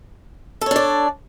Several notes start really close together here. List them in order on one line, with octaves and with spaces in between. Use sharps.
A4 C#5 D4 D5